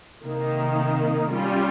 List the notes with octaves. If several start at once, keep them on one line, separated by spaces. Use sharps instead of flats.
C3 D#3 A#3 D#4
G3 C#4 F4